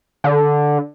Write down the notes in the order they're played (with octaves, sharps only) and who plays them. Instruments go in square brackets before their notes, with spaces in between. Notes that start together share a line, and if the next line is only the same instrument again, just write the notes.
[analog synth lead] D3